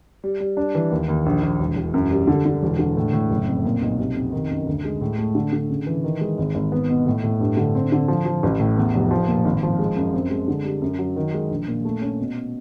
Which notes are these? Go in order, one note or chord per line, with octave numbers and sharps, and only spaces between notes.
G3
G3
D4
E3
D#2
D#2
A#1
A#1
E1
E1
F#2
G3
D3
D3
E1
D3
A2
A2
F#1
F2
A#2
B1
C3
F2
D#3
F#2
D2
G#3
A2
A3
D3
D3
C#3
E3
D#3
G#3
G#1
G#1
B3
B2
A2
A2
G2
D3
C4
D3
F3
F3
A1
A2
E2
F1
F3
A#2
G#1
F3
G#3
F#2
C4
G#3
D3
G3
F#2
F#3
D#3
G#3
A#1
A#2
A3
C#4
B2